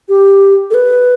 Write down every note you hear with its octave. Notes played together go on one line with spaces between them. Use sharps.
G4
A4
B4